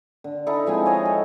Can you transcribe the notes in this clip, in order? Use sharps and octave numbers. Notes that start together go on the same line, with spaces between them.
D3
D#4 E4 A4
F3 G#3 C4 G#5
D#4 C#5 D#5 F5
A4